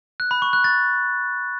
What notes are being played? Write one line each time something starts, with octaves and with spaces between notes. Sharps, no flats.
F#6
B5
C#6
F#6
A6